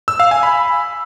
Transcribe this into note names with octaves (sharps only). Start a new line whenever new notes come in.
E6
F5
G#5
B5